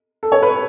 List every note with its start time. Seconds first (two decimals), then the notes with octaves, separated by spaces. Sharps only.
0.23 A4
0.32 C#5
0.43 B4